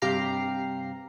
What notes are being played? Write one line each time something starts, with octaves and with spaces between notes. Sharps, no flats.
G2 C3 G4 F5 A#5 C7